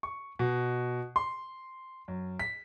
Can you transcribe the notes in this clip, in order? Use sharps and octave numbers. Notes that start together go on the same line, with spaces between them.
C#6
B2
C6
F#2
B6